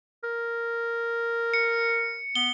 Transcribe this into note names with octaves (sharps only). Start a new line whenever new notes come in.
A#4
C#7
B3 G7